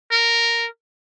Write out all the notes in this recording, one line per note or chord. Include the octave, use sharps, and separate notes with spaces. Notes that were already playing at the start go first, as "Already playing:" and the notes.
A#4